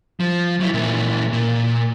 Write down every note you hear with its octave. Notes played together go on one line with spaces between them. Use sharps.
F3
F#3 E4
A#2 E3
A#2